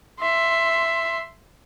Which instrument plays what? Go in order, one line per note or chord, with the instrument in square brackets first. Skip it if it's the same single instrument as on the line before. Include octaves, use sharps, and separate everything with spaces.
[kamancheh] E5 C6